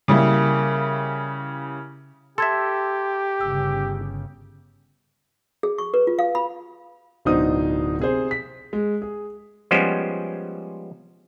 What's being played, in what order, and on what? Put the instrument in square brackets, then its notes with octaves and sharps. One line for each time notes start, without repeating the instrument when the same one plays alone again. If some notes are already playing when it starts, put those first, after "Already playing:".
[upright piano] C#3 G3 A#3 E4
[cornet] G4 [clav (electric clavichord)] A4 E5 [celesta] C6 G#6
[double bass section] G1 C#3 [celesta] E6
[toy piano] G#4
C#6
B4
F4
F5
B5
[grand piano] D1 B2 D4 D#4 C5 D#6
C3 G#4 C5
B6
G#3
G#4
[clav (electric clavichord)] F3 G3 G#3 B3 C#4 C5